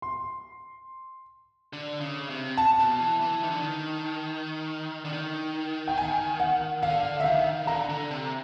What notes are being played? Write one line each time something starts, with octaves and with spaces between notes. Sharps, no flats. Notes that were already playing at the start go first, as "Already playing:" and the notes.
C6
D3
C#3
C3
A5
B2
E3
E3
D#3
D3
D#3
D3
D#3
G5
G#5
F#5
D3 F5
E5
D#3 F5
D3 A#5
D3
C3